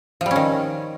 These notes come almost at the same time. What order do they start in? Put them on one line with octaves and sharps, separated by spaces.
F3 G3 C#4 D#3